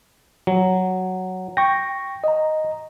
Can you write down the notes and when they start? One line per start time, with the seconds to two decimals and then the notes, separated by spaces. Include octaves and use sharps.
0.47 F#3
1.57 G5 C#6 A#6
2.24 D#5 A#5